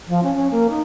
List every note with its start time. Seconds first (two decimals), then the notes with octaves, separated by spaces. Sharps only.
0.07 F3
0.23 C#4
0.34 C#4
0.51 A#3
0.69 D#4